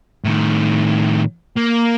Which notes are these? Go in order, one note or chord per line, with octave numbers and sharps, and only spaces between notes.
A2 D#3
A#3